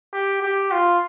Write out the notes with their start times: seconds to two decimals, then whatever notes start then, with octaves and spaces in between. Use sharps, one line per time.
0.13 G4
0.42 G4
0.71 F4